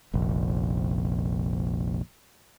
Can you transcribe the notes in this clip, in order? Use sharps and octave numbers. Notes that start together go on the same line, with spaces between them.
F1 A#1